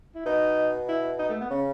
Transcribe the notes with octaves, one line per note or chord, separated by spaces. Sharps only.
E4
B2 D#4
E4
D#4
A3
B3
C#3 C#4